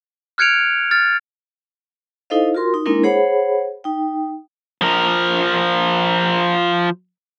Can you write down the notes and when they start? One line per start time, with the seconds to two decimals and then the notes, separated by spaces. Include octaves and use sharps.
0.38 F6 F#6 G#6 C#7 D7 F7
0.91 F6 A6
2.30 D#4 E4 A4 C5 D#5 F5
2.54 F4 F#4 A#4 C6
2.74 D#4
2.86 G#3 A#3 C4 D4 E4 A#4
3.03 G#4 C5 C#5 F#5 B5
3.84 D#4 G5
4.81 F3 A#4